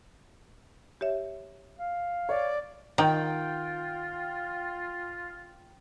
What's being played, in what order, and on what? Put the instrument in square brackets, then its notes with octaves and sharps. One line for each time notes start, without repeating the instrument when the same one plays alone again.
[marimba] G4 C#5 E5
[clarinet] F5
[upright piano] C#5 [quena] D5
[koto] D#3 [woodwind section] F4 [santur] G5